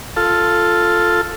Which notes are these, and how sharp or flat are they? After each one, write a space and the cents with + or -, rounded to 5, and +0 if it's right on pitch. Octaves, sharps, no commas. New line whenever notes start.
F4 +0 A4 +0